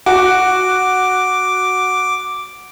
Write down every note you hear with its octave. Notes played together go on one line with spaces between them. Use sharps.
F#4 D6